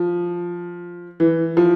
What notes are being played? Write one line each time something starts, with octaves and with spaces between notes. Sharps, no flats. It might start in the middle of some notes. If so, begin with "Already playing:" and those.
Already playing: F3
E3
F3